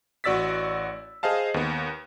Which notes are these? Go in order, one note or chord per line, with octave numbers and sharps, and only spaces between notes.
A1 F#4 D5 E6 A6 B6
G#4 C5 D#5 F5 A5
D#2 B3